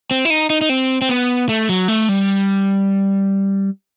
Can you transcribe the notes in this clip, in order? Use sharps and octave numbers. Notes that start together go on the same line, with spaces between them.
C4
E4
D#4
D#4
D#4
C4
C4
B3
A3
F#3
A3
G3